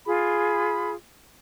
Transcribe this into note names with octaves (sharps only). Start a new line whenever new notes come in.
F4 G#4 B5